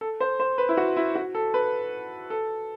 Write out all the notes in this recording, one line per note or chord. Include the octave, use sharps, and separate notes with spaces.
A4
C5
C5
B4
E4
F#4
E4
F#4
A4
B4
A4